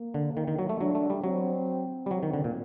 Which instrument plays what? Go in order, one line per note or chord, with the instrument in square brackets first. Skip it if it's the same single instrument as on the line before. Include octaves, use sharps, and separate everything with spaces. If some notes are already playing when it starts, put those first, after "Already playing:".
Already playing: [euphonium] A#3
[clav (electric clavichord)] D3
D#3
D#3
F#3
A3
[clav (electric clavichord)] F#3 [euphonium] D4
[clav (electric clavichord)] A3
G3
[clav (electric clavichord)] F#3 [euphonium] C4
[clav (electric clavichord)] G3
[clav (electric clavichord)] F#3 [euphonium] C4
[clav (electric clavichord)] D#3
D3
A#2